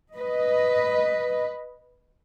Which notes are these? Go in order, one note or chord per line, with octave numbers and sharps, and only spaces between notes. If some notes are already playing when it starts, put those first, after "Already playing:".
B4 D#5